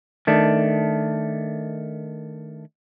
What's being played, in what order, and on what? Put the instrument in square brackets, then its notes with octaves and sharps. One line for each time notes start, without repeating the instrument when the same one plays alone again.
[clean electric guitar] D#3 A3 D4